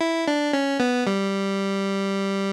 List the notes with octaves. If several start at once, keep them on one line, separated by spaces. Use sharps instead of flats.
E4
D4
C#4
B3
G3